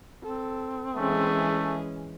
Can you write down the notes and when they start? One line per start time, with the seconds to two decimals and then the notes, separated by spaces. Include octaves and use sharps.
0.23 C4 A4
0.97 E3 G#3 A3 C#4 G#4